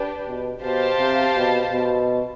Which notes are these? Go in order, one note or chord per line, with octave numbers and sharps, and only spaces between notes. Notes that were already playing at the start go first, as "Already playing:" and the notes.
Already playing: D4 G4 B4
B2
B2 G4 C5 F5 A5
C3
B2
B2